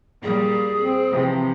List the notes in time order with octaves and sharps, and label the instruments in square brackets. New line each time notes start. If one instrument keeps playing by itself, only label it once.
[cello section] A#2 G3 [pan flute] G#4
[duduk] C4
[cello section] C3 E3 F3